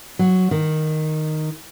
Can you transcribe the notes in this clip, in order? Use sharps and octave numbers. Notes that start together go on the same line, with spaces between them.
F#3
D#3